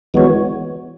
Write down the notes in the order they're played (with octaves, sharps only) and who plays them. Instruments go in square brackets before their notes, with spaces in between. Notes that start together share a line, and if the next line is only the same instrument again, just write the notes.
[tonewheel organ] E3 G#3 B3 F#4 C#5